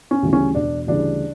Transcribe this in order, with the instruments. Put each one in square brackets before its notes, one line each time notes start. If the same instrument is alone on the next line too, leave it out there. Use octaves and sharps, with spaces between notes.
[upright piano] C#4
D2 C#3 E3 G3
C#4
E1 D4
D2 C#3 E3 G3 D4